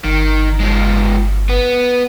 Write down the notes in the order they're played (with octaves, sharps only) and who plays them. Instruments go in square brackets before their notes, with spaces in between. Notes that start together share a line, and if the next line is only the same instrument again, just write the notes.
[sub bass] G1 [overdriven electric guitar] D#3
[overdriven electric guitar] F3 G#3
B3